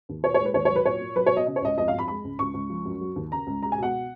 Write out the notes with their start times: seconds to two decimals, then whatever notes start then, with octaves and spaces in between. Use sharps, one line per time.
0.09 D#2
0.24 A#2 C#5
0.34 C#5
0.39 G#3
0.45 B4
0.54 D#2 C#5
0.65 C#5
0.71 F#3
0.76 B4
0.86 A#2 C#5
1.01 A#2
1.16 F#3 B4
1.26 C#5
1.31 B2
1.37 D#5
1.47 C#3 D#5
1.56 C#5
1.62 C#2 D#5
1.77 F2 D#5
1.88 F5
1.94 F2 B5
2.08 G#3 B5
2.24 C#2
2.39 C#2 C#6
2.54 C#2
2.70 F3
2.85 F#2
3.01 F#3
3.16 D#2
3.32 C#3 A#5
3.47 C#2
3.62 G#3 A#5
3.72 G#5
3.78 B2 F#5